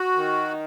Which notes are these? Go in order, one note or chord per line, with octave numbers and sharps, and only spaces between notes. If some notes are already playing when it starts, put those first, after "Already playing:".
Already playing: F#4
D#3